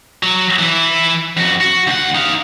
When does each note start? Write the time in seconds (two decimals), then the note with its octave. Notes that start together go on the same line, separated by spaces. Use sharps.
0.23 F#3
0.59 E3 E4
1.37 F2 F#4
1.61 F#4
1.87 D2 F#5
2.15 D#4 F5